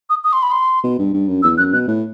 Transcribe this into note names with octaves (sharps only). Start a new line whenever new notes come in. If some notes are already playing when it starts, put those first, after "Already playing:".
D#6
D#6
C6
B5
C6
B2
G2
G2
F#2
E2 E6
F#2 F#6
B2 F#6
A2